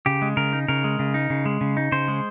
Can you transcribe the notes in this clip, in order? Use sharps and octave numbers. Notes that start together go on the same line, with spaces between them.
C#3 G4
G#3
C#3 A#4
D#4
C#3 A#4
G#3
C#3
D#4
C#3
G#3
C#3
D#4
C#3 C5
G#3